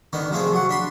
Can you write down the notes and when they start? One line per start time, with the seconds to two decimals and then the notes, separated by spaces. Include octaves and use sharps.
0.13 D3 D#3 B3
0.31 C3 F3 A3 C4 G#4
0.52 F#3 F#5
0.69 D4 B5 C6